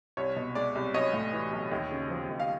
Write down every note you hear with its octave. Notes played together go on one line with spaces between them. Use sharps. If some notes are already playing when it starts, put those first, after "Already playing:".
C2 C#5
B2
G#3 D5
C2
B1 C#5 D#5
A2
E3
B1
D#2
C#3
F3
D#2
F5